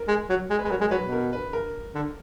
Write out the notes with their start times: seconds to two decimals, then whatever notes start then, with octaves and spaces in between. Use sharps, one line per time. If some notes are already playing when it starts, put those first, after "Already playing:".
Already playing: A#4
0.08 G#3
0.29 F#3
0.50 G#3
0.59 B4
0.65 G#3
0.70 F#3 A#4
0.81 G#3
0.91 F#3 B4
1.02 B2
1.12 A#4
1.33 B4
1.53 A#4
1.95 D3